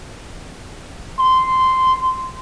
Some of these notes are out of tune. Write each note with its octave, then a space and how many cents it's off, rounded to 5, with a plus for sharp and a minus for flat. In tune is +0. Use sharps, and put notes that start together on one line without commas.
C6 -10